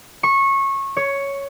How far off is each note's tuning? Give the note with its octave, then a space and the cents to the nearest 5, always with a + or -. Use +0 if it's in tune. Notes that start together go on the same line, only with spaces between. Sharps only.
C#6 -20
C#5 +5